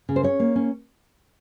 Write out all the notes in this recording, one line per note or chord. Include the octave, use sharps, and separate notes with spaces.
C#3
C5
C#4 C#5
A#3
C#4